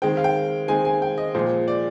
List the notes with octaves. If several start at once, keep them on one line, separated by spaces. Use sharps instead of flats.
D#3 G#3 C4 G5
F5
G5
D#3 G#3 C4 G#5
G#5
G5
D#5
A#2 F3 G#3 C5
D5